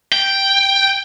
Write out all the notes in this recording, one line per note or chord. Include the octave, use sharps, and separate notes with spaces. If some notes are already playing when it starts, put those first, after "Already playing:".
G5